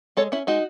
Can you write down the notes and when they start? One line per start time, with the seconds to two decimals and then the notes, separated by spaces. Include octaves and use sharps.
0.17 G#3 A4 C#5
0.32 C#4 E4
0.47 G#3 D#4 F#4